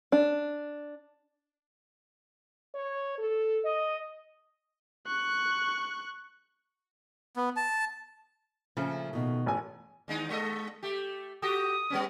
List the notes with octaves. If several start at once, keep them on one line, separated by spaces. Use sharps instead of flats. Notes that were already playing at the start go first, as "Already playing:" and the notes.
D4
C#5
A4
D#5
C#6 F#6
B3
A5
A#2 C#3 F3 A3
B2 D#3
A1 G#5
D#2 G#3 D#4
G#3 A4 D#5
A3 G4
F#4 G4 A4 D#6
G3 B3 C#4